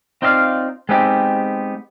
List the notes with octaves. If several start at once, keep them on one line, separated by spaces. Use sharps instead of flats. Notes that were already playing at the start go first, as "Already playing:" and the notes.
C4 D#4 F4 D5 D#5 F5
G#3 B3 C4 D#4 G4